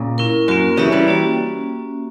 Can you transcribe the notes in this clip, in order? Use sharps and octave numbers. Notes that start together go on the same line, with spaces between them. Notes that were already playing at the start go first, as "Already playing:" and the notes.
Already playing: A#2 C#3
C#4 E4 A#4
F#2 A#3 C#4 F#4 A#4
C#3 E3 C#4 G4 C#5 E5
E3 G3
A#3 C#4 F#4